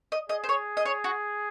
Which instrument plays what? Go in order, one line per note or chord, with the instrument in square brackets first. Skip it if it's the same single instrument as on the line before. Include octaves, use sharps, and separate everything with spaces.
[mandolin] D#5
[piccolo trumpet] G#4 [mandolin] D#5
[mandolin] C5
C#5
D#5
C#5
F#4